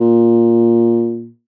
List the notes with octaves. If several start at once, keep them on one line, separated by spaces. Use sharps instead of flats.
A#2